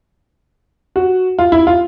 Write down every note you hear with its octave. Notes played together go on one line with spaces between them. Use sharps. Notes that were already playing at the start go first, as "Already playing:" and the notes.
F#4
F4
E4
F4